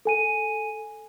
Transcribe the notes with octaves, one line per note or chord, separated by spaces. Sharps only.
A4 G#5 D#7